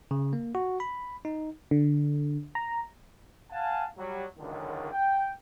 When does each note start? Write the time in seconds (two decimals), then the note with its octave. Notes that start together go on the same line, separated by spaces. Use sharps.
0.11 C#3
0.33 A#3
0.55 F#4
0.80 B5
1.25 D#4
1.71 D3
2.55 A#5
3.51 F5 F#5 G#5 A5
3.97 F#3 G3
4.38 C#2 F#2 D3 D#3
4.92 G5